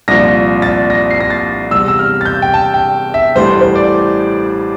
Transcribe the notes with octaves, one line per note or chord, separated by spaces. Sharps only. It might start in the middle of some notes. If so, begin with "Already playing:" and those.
C2 A#2 F3 A#6
A6
A#6
C7
A#6
A6
E2 C3 G3 E6
E6
F6
A6
G6
G5
A5
G5
E5
A1 A2 E3 G3 C5
C5
D5